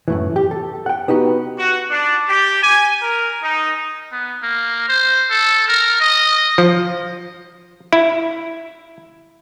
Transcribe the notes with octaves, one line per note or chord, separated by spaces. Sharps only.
F#2 A2 E3
G4
A4
F#5 G5
B3 D#4 F#4 G4
F#4
D4
G4
G#5
A#4
D#4
B3
A#3
C5
A4
A#4
D#5
F3
E4